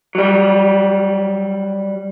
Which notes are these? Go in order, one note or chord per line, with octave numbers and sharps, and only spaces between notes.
F#3 G3